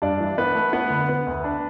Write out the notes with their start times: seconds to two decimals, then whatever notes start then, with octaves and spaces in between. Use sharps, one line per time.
0.02 G2 D4 D5
0.20 E3
0.38 E3 B3 B4
0.55 A3
0.73 B3 B4
0.90 D3
1.09 B3
1.27 D2
1.44 D4